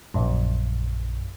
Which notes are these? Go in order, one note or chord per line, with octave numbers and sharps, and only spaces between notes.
A#1 F#2